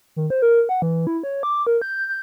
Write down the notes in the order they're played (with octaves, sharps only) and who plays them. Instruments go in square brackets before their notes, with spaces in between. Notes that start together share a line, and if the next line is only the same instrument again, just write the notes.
[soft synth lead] D#3
C5
A#4
F#5
E3
E4
C#5
D6
A#4
G6
G6